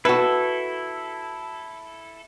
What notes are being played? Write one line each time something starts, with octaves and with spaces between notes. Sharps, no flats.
E4 F#4 A4 B4